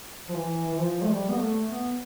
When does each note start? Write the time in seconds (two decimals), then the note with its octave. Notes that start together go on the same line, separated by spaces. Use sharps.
0.29 F3
0.35 E3
0.72 E3
0.79 F3
1.03 A3
1.09 G3
1.29 B3
1.38 A3
1.68 B3